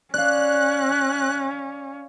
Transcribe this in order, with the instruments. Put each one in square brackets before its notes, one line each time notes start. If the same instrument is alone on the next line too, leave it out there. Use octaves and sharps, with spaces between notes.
[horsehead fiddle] C#4 [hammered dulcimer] D5 F5 [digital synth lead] F#6